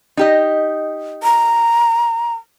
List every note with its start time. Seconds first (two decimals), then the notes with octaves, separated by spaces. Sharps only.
0.17 D#4 G4 D#5
1.23 A#5